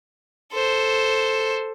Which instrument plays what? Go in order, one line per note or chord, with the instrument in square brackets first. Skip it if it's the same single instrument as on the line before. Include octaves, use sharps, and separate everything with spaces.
[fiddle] A4 C5